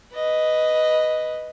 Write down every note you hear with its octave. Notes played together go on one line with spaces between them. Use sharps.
B4 D#5